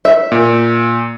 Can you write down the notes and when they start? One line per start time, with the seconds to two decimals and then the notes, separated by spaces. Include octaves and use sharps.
0.05 E5
0.32 A#2